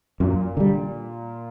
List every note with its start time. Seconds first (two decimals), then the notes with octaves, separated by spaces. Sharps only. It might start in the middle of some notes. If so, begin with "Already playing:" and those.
0.20 F#2 A#2
0.57 D3 G3